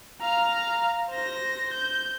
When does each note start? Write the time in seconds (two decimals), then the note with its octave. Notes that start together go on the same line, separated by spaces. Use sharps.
0.21 F5 A#5
1.10 C5 A#6
1.73 G6